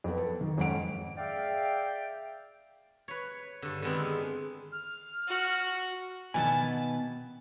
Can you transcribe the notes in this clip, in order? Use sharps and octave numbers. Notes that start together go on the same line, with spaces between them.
F2 B3
A4
D#3
F2 G#2 C#4 F#5 D7
G#4 D5 E5 F5 G5
B4 C#5
G2 D3
D3 D#3 G#3 B3 C4
F6
F#4
B2 D#3 B3 B4 G#5 A5